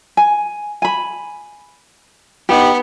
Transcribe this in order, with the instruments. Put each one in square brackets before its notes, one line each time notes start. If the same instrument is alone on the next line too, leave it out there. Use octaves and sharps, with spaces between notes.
[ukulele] G#5
G#5 B5
[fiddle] B3 [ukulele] D#4 G4